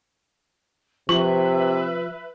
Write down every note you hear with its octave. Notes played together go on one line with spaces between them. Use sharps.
C3 F3 B4 E5 C#6